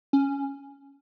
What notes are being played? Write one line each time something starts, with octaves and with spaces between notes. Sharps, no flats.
C#4